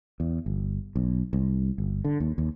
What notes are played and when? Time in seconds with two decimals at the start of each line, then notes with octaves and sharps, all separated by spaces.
0.20 E2
0.46 G1
0.96 B1
1.33 C2
1.78 G1
2.05 D3
2.20 D#2
2.38 D#2